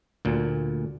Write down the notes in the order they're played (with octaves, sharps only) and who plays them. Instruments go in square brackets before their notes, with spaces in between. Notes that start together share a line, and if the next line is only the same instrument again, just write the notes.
[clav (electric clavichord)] D2 A#2